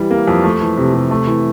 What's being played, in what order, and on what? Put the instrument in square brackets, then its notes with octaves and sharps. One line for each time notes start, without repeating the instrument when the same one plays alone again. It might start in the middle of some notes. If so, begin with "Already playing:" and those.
Already playing: [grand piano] E3 G3
A#3
F2
A3
E3
C3
C3
A3
E3